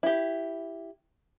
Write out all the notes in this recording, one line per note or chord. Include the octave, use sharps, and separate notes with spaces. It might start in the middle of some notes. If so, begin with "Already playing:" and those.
E4 G4